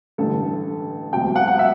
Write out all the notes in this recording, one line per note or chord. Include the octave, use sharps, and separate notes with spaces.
A1 G2 D3 A4
E1 D2 C3 F#3 C4 G5
F#5
F#5
E5